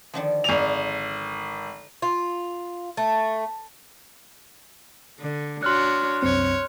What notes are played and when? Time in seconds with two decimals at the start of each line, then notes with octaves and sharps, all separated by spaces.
0.14 D3 D#3 F3
0.44 G#1 D5 G#5 F7
2.02 F4
2.97 A3
5.20 D3
5.63 D4 F#4 C#5 C6 F6 F#6
6.22 C2 F#2 C4 C#5